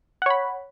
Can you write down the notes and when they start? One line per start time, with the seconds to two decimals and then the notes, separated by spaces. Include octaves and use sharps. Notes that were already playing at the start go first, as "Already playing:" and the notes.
0.22 F#5
0.26 C#5
0.30 B5